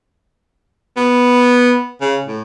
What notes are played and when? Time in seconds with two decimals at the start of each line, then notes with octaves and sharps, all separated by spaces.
0.97 B3
2.01 C#3
2.26 A2